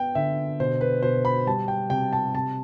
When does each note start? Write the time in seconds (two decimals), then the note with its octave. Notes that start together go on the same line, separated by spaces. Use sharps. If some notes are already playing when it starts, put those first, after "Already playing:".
Already playing: B3 G5
0.15 D3 E5
0.60 B2 C5
0.81 B4
1.03 B2 C5
1.25 B5
1.47 G3 A5
1.68 G5
1.90 C3 G5
2.13 A5
2.34 C3 A5